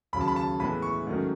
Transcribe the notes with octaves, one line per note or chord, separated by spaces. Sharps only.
D#2 C#3 F#3 B5
A5
B5
A5
A2 E3 G#3 B3 B5
C#6
G#2 D#3 F#3 A3 C#4